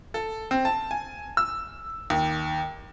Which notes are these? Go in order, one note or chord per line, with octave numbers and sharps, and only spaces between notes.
A4
C4
A5
G#5
E6
D#2